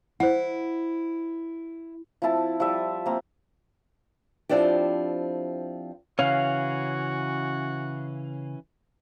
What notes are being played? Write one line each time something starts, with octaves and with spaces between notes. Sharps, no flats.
E4 C5 F#5
F3 C4 E4 A5
F3 G3 E5
A#3 C4
F3 C4 D4 E4 G4
C#3 E3 C#4 F#4 C#5 F5